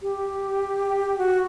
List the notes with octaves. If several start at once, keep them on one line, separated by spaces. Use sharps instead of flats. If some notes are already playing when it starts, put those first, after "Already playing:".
G4
F#4